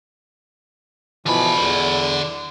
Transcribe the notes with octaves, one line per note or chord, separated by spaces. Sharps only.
B2 D3 E3 F3 B5
E2